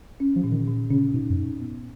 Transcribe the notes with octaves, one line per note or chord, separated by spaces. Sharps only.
C#4
F3
A#2
D#3
A#2
C#3 C#4
B2 D#4
F#2
D#4
B3